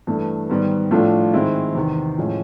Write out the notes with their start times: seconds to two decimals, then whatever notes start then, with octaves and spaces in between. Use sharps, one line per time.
0.07 G2 E3 A3
0.49 G#2 D#3 G3 B3
0.91 A2 F3 A3 D4 F4
1.33 G#2 D#3 G#3 C4 E4
1.75 E2 C3 D#3
2.18 A2 F3 G#3 C#4